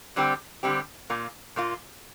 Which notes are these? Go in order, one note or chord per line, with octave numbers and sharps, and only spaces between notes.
D3 G3 C4 G4
D3 G3 C4 G4
A#2 A#3 F4
A#2 A#3 F4